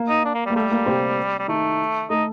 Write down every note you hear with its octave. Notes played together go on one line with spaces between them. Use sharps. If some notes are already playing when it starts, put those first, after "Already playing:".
Already playing: A#3
D#4
D4
A#3
G3
A#3
G3 A3
A#3
C3 C4
G3
D#3 A3 D#4
A3 D#4 A4